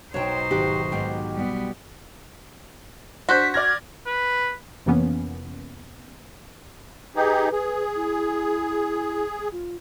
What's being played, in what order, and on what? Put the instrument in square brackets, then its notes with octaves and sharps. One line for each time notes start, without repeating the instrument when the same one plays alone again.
[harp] B1 F#4 E7 [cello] D#4 C5 [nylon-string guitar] C#5 G5
[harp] G#1 F#4 [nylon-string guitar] G4
[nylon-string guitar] G#2 B2 D#3 [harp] G4
[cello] G3 B3
[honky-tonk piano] D4 C5 [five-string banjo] F#4 [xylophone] C6 F#6 G6 [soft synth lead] B6
[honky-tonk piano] D5 F6 A#6 [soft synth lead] G#6
[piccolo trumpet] B4
[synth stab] F2 C3 E3 A#3 B3 C#4
[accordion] D#4 G4 G#4 [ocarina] B4
[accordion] G#4
[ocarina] E4
F4